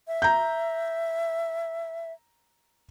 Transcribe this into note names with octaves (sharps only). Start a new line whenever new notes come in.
E5
A#5 G6